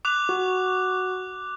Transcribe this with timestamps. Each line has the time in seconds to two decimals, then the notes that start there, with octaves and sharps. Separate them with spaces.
0.05 D6 F#6 F7
0.29 F#4